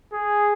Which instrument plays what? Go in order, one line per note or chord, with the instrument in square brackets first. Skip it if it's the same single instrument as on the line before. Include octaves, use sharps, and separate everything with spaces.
[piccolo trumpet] G#4